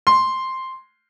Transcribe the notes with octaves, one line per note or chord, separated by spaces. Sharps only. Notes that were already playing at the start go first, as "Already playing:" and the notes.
C6